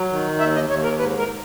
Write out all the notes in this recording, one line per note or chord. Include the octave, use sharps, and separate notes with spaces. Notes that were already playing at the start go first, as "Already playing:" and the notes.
Already playing: F#3
D#3
D#2 E5
D#5
D#2 C#5
A#4
G#2 B4
A#4